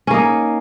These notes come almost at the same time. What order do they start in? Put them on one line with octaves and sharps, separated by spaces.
C#4 A#3 D#4